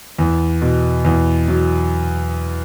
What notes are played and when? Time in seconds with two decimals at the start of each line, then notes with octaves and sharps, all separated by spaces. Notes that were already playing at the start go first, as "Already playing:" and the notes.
0.19 E2
0.62 B2
1.05 E2
1.48 F#3